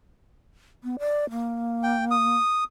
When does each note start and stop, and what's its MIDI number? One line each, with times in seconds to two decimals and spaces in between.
0.83 0.96 59
0.99 1.29 74
1.30 2.37 58
1.83 2.05 79
2.11 2.64 87